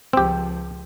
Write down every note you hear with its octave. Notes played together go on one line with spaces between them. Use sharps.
C#2 F3 C4 G4